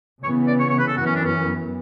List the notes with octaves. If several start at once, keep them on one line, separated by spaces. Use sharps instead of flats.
C#3 E3 B3 C#5
D5
C#5
C#5
B4
A4
F#2 E3 B3 F#4
C#4
D4
C#4